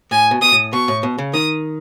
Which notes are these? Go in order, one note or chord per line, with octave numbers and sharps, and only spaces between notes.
A2 G#5
B2
B2 D#6
A2
B2 C#6
A2
B2
C#3
D#3 D#6